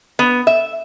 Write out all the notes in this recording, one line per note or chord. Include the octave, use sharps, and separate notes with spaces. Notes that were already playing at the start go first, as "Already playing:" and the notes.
B3
E5